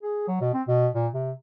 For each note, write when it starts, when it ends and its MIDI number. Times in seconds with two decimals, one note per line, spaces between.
0.03 0.27 68
0.28 0.41 54
0.41 0.51 47
0.54 0.63 60
0.68 0.89 47
0.94 1.08 46
1.14 1.32 48